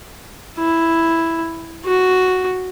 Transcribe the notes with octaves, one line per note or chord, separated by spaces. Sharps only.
E4
F#4